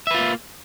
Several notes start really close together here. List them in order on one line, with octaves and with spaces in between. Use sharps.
E5 B4 F4 A#3